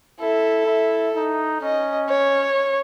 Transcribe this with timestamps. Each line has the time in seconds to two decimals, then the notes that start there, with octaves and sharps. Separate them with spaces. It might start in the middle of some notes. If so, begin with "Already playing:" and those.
0.20 E4 A4
0.67 E4
1.15 D#4
1.61 C#4 D#5
2.09 C#5